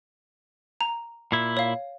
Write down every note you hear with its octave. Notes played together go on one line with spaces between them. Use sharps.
A#5
A#2 E4
C#5 F5